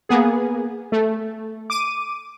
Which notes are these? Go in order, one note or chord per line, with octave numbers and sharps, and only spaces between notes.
A#3 B3 G#4
A3
D6 D#7